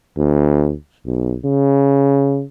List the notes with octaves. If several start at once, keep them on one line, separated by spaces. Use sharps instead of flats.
D2
B1
C#3